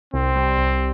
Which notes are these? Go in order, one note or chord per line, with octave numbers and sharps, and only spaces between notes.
C2 C4
G3
C2